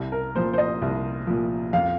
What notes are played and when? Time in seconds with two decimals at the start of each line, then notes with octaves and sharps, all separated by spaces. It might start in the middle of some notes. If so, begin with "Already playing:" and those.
Already playing: C2
0.12 A#4
0.35 A#2 F3 C5
0.53 C5
0.58 D#5
0.82 C2
1.27 A#2 F3
1.73 F2 F5